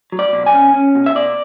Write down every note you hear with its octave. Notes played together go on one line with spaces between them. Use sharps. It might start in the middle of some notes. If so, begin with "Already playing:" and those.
F#3
D5
B2
G#5
C#4
C#4
B2
E5
B2 D5